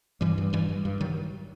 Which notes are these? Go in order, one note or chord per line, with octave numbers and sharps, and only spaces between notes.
G2 E3 G3
G2
G2 E3 G3
G2
G2
D#3 F#3